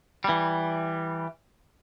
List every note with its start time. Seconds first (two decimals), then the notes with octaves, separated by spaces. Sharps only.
0.24 E3 G3